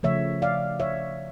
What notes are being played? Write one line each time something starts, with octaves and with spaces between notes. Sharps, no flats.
C#3 F3 A3 C#5 E5
D5 F5
C#5 E5